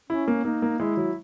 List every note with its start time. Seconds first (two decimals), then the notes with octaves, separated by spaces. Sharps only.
0.10 C#4 E4
0.28 A#3
0.45 A#3 D#4
0.62 A#3
0.79 G#3 E4
0.97 F#3